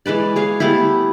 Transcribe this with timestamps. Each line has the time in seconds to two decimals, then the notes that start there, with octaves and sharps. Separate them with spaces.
0.06 E3 G#3 B4 D5
0.36 G#4 C#5 F5
0.60 G3 A3 B3 E4